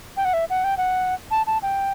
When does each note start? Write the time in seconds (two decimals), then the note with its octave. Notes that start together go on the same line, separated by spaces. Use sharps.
0.17 G5
0.25 F#5
0.33 E5
0.50 F#5
0.64 G5
0.77 F#5
1.31 A5
1.47 A5
1.62 G5